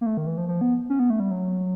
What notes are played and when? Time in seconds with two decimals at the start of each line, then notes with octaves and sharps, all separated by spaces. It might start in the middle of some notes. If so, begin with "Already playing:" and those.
0.01 A#3
0.06 A3
0.17 D#3
0.27 E3
0.38 F3
0.48 F3
0.61 B3
0.90 C#4
0.99 B3
1.10 A3
1.20 G3
1.31 F#3